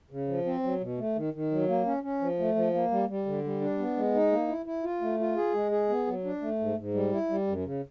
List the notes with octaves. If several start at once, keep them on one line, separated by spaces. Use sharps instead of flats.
C#3
F3
C4
F#3
B2
A3
D#3
D#3
F#3
A#3
C#4
C#4
F3
A3
F3
A#3
G3
G3
D3
G3
D4
B3
G#3
D#4
A#3
E4
E4
F4
A3
F4
G#4
G#3
G#4
B3
F#3
D4
A3
G#2
G#2
G3
E4
G3
F#2
C#3